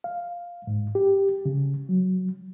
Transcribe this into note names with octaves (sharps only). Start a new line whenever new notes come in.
F5
G#2
G4
C#3
F#3